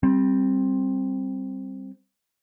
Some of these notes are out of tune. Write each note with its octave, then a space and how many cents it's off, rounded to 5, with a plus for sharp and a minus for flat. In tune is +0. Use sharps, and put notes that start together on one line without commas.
G3 +0 C4 +10